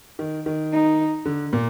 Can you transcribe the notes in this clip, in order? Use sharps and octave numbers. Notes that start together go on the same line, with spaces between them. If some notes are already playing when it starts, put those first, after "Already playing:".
D#3
D#3
D#4
D3
A#2